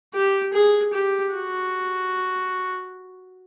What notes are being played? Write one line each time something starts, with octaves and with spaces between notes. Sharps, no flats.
G4
G#4
G4
F#4